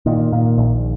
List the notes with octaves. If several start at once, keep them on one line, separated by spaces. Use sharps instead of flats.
A#2 D#3
A#2
A#1